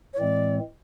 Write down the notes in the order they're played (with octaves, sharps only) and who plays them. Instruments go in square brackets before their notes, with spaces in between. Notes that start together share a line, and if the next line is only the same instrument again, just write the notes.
[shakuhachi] C#5
[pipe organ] A2 E3 G#3 C4 [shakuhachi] D5